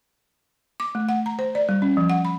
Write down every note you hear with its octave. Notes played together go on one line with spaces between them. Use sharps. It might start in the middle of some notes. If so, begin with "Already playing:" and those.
D6
A3
F#5
A#5
C5
D5
G3
C#4
F3
F#5
B5